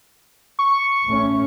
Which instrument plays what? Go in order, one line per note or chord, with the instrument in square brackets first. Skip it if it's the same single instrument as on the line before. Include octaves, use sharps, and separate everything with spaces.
[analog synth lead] C#6
[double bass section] A1 A3 C#4